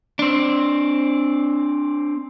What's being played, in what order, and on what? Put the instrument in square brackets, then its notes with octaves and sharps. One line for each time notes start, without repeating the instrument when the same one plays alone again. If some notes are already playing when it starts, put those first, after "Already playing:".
[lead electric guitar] C4 D4